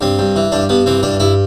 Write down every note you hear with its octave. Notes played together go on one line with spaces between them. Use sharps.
G2 C4
G2
E3
G2 D4
G2 B3
E3 C4
G2 D4
G2 E4